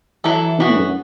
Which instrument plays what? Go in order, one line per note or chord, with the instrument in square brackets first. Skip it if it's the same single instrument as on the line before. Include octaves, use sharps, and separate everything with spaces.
[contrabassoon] E3 [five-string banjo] F#3 A3 E4 A4
[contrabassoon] B2 [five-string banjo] E3 B3 F#4
[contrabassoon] A2
F#2